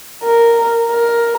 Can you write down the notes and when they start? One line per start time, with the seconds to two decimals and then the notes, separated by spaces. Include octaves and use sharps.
0.24 A#4
0.90 A#4